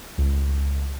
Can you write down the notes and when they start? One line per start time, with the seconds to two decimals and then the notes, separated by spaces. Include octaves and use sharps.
0.18 C#2